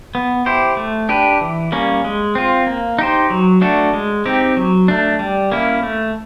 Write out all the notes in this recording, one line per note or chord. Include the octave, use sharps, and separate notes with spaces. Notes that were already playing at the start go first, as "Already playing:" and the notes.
B3
E4 G4 C5
A3
D4 G4 B4
E3
G3 A#3 C#4
G#3
C4 F4
A#3
D#4 G4 C5
F#3
A3 D4 F#4 A4
G#3
C4 D#4 G4
F#3
A3 D4
G3
A#3 C#4 E4
A3